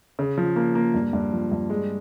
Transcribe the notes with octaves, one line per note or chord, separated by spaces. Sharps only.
C#3
F3
A#3
A#3
G2
G2
F3
G2
G#3